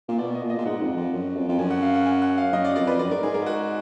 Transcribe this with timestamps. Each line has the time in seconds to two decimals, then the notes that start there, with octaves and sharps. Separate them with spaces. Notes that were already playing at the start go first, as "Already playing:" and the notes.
0.09 A#2
0.18 B2 D5
0.35 D#5
0.42 A#2
0.50 D#5
0.58 A#2
0.66 G#2 F#5
0.82 F2
0.97 F2
1.13 F#2
1.36 F2
1.48 F2
1.59 F#2 G#5
1.71 F#5
1.82 F5
1.94 F#5
2.06 G#5
2.22 F#5
2.38 F5
2.53 F#2 D#5
2.65 D5
2.76 F2 D5
2.87 B4
2.99 F#2 D5
3.11 G#2 A#4
3.22 G#2 G#4
3.34 G#2 A#4
3.46 F#4